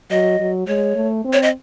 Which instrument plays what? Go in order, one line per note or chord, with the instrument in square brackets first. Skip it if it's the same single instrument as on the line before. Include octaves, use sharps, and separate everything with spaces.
[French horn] F#3 [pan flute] D#5
[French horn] F#3
[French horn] G#3 [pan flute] C#5
[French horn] A3
C4
[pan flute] C#5
D#5